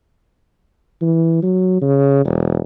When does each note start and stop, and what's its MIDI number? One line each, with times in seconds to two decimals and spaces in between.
1.01 1.38 52
1.42 1.80 54
1.81 2.24 49
2.25 2.59 28